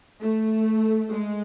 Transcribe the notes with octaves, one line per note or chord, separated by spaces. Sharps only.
A3
G#3